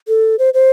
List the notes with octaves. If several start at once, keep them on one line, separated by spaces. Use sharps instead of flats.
A4
C5
C5